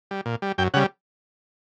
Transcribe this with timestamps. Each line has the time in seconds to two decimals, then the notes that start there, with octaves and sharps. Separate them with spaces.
0.11 G3
0.26 A#2
0.42 G3
0.58 F#2 G5
0.74 C#3 G3 F#5